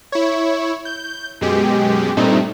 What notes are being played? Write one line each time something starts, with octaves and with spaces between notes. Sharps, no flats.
E4 C#5
G6
F#2 B2 G#3 G4
G2 A#2 G3 A3 C4 D#4